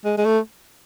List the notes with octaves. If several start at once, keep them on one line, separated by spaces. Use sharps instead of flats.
G#3
G#3
A3